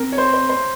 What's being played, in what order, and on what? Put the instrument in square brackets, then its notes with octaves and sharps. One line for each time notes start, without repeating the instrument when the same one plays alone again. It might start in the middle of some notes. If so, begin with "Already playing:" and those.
Already playing: [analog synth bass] C4 [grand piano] A#4
[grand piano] C#5
C5
C5
C5